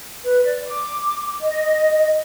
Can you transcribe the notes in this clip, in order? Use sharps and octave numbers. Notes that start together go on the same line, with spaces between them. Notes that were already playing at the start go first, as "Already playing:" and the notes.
B4
D5
D6
D#5